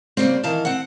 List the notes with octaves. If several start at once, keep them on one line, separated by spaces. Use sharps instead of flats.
C#3 G3 A#3 C4
D#3 E3 F5 A5
C4 F#5